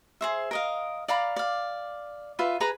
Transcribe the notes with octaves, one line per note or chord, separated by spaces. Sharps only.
G#4 C5 E5
A#4 D#5 F5
D5 F5 A#5 B5
D5 F5
F4 B4 E5
G#4 B4 A#5 B5